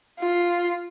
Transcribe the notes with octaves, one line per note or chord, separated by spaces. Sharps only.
F4